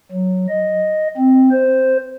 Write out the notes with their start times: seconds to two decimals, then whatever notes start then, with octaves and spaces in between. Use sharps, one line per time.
0.12 F#3
0.49 D#5
1.17 C4
1.51 C5